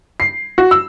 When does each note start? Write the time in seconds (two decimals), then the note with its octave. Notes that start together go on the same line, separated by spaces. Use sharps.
0.20 C7
0.58 F#4
0.71 E6